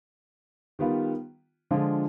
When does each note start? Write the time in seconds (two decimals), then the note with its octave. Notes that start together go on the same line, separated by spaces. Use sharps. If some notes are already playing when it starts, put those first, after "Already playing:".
0.79 D#3 G3 B3 F4
1.71 D3 F3 G#3 D4 F4